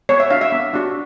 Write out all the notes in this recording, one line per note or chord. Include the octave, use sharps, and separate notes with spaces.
B3 C#5
E5
D4 F#4 F5
E5
B3
D4 F#4